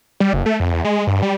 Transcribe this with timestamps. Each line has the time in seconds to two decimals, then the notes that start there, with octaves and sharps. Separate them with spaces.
0.20 G3
0.33 F#1
0.46 A3
0.60 F2
0.72 E2
0.85 G#3
1.07 G2
1.22 G3